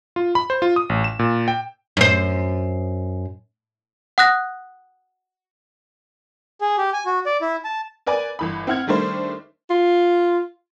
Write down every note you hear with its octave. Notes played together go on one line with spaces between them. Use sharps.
F4
B5
C5
F4
D#6
A1
E7
A#2
G5
F#2 C5
F#5 D#6 F#6 A#6
G#4
G4
G#5
F#4
D5
E4
A5
A#4 B4 D5 G#5
G1 E3 B5
C4 E4 F#5 F6 G#6
D#3 G3 A3 D4 C5
F4